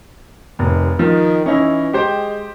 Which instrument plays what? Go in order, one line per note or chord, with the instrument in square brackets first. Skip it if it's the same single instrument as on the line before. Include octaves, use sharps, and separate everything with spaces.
[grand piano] F1 [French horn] D#2
[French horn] D#3 [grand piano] F3
[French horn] E3 [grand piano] C#4 D#4 E4
[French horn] G#3 [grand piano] G4 C5 G5